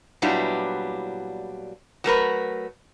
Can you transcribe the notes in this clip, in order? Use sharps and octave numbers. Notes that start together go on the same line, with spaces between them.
A#2 F#3 G3 B3 D4 E4
F#3 A3 A#4 B4